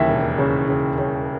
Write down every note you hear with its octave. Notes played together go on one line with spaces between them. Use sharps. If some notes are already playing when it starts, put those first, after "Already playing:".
Already playing: D#2 C#3 E3 E5
E1
C#3
C#3
C#3